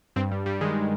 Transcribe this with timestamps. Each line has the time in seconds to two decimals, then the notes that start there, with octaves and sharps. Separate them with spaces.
0.16 G2 C4
0.31 G2 G3
0.46 G2 G3
0.61 D#3 G#3
0.75 D#3